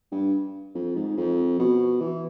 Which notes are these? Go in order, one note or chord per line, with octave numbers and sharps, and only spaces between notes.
G2
F2
G#2
F2
B2
E3